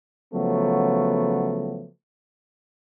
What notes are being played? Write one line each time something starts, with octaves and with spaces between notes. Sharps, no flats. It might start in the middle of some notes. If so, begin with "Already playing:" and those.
C#3 F3 F#3 A3 B3